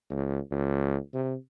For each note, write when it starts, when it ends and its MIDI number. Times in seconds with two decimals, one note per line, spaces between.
0.10 0.40 37
0.52 0.97 37
1.14 1.35 48